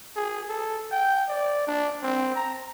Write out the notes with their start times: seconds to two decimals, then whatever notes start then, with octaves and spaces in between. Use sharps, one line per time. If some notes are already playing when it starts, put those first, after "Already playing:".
0.15 G#4
0.49 A4
0.91 G5
1.29 D5
1.67 D4
2.03 C4
2.35 A#5